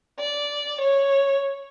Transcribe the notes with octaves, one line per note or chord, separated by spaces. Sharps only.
D5
C#5